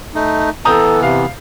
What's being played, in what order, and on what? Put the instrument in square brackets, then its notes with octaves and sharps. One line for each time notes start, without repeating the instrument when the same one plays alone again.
[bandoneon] A3 D#4
[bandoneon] E3 B3 [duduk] A4 [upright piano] A#5 D#6 G6
[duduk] C3 [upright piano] F5